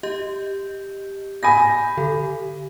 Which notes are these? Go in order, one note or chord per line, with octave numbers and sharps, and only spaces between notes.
G4 D#5 G6
G#5 B5 G6 A#6
D3 A4